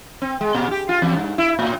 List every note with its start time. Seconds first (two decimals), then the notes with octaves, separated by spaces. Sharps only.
0.22 C4
0.41 G#3
0.54 A#2
0.71 G4
0.89 F4
1.02 E2
1.16 G2
1.38 E4
1.59 A2